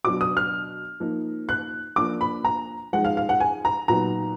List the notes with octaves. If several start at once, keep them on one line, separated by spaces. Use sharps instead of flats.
B2 F#3 D4 D6
D#6
F6
F3 A#3 D#4
F#6
F3 A#3 D4 D6
B5
A#5
F3 G#3 D#4 F#5
F5
F5
F#5
G#5
A#5
A#2 F#3 B3 D#4 A#5